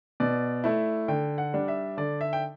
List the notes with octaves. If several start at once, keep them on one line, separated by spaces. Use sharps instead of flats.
B2 D5
A3 E4
D3 G5
F#5
G3 D4
E5
D3 D5
E5
G5